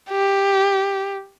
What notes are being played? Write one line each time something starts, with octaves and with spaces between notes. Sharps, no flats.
G4